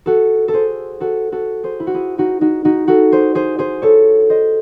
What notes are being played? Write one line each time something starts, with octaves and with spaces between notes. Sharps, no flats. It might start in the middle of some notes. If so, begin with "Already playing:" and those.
F#4 A4
A4
G#4 C5
F#4 A4
F#4 A4
G#4 C5
E4
F#4
E4 G#4
D#4 F#4
D#4 F#4
D#4 F#4
F#4 A4
G#4 C5
G#4 C5
G#4 C5
A4 C#5
C5 D#5